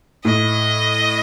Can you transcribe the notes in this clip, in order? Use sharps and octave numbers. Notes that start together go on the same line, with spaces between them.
A2 D#5